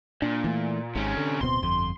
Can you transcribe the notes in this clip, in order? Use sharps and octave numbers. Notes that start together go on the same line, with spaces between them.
A#2 D4
E3 A3
G#1 G#2 C3 C#4
D3
D1 B2 C4 C6
G1 F2